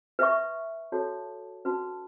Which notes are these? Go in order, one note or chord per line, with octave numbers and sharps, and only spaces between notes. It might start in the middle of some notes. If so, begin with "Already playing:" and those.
B4 E5 C#6
F#4 A4 C#5 A5
C#4 F#4 B4 A5